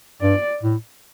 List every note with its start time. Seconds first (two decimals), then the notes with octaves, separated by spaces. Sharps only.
0.22 G2 D5
0.63 A2